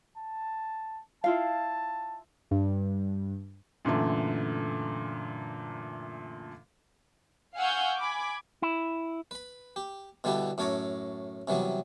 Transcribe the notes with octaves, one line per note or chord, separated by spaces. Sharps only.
A5
E4 F4 F5 A5
G2
F#2 A#2 D3 E3 A3
F5 F#5 G#5 C#6 E6 G6
G#5 B5 D6
E4
B4 B5
G4
B2 D3 G3 E4 G4 B4
F#2 A2 A4 C#5 A#5 D6
C3 E3 F#3 G3 B3